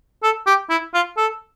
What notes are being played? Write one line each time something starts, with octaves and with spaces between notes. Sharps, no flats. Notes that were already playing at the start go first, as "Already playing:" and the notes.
A4
G4
E4
F4
A4